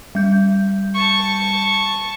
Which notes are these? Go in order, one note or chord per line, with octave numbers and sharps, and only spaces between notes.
G3 G6
A5 C#6